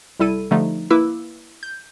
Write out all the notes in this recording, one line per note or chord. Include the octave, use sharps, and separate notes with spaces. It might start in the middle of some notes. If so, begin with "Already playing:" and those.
C2 G3 E4 A4 D#7
D3 F3 G3 A3 D#4
A#3 E4 B4 D6 E6
G6